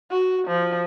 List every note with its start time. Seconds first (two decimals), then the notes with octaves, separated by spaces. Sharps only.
0.10 F#4
0.47 F3